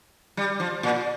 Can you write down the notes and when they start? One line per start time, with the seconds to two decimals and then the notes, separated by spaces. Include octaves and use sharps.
0.37 G3
0.60 F3
0.83 A#2